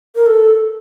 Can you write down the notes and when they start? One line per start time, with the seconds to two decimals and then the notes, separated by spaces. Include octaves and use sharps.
0.15 A#4
0.26 A4